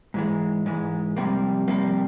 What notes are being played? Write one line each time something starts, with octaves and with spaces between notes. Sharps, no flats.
G#2 E3 G#3
G#2 E3 G#3
F2 C3 G3 A#3
F2 C3 G3 A#3